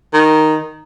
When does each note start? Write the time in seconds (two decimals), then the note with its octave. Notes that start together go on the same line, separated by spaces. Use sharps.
0.14 D#3